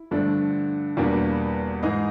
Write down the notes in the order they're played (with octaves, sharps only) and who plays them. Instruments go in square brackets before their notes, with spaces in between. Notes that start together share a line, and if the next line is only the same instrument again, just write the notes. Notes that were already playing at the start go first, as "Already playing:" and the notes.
Already playing: [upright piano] E4
G2 D3 F3 A3 D4
E2 B2 G3 A#3 D4
G#2 E3 G#3 D#4 D#5